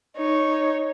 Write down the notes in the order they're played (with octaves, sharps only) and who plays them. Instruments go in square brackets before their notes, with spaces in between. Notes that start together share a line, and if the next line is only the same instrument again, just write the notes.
[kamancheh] D#4 C#5